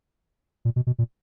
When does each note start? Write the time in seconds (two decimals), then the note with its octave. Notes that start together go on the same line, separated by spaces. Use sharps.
0.65 A#2
0.76 B2
0.87 B2
0.99 A#2